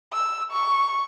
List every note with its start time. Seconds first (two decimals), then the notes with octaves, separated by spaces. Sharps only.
0.13 E6
0.51 C#6